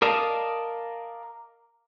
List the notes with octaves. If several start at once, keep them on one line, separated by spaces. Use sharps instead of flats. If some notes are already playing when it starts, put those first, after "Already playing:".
A#4 D5 D#5 F5 A5